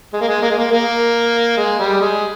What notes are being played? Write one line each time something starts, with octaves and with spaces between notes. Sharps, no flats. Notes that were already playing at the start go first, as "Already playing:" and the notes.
G#3
A#3
G#3
A#3
G#3
A#3
A#3
G#3
G3
G#3